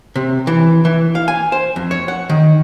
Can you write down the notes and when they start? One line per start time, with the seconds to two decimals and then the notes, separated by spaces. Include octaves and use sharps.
0.16 C3
0.47 E3
0.85 E3
1.15 F5
1.28 G#5
1.52 C5
1.76 F2
1.91 C#5
2.08 F#5
2.29 D#3